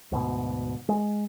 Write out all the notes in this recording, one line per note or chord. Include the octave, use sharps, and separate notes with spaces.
D2 G#2 B2
G#3